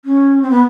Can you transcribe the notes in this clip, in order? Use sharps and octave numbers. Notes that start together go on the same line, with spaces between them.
C#4
C4
B3